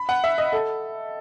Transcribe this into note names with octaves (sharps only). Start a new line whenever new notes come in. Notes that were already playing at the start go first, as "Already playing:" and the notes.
Already playing: B5
F#5
E5
D#5
A4